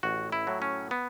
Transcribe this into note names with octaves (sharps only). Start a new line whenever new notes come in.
A1 F#4
E4
A2 F#3
C#4
B3